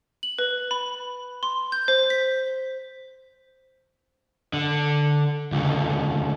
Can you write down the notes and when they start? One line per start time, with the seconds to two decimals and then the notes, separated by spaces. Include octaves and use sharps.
0.23 F#7
0.39 B4
0.71 B5
1.43 C6
1.72 G6
1.88 C5
2.10 B6
4.53 D3
5.52 C#2 D3